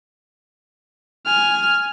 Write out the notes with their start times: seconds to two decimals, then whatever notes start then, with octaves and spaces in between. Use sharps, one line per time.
1.26 G#5 F6